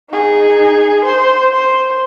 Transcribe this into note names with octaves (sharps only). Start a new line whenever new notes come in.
D#4 G#4
C5
C5